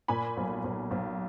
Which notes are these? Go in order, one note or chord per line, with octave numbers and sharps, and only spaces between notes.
A#2 G#5 B5
B1
B1
B1